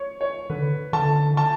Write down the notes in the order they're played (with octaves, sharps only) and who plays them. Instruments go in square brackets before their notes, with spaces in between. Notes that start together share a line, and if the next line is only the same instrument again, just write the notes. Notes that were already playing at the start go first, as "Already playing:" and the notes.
Already playing: [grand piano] C#5
C#5
[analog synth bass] D3 [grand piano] B4
[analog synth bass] D3 [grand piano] A5
[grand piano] A5